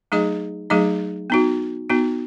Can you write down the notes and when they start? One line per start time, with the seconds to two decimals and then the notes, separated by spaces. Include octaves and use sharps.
0.12 F#3 A3 D#4 G#4 D#5
0.70 F#3 A3 D#4 G#4 D#5
1.30 B3 D#4 F#4
1.90 B3 D#4 F#4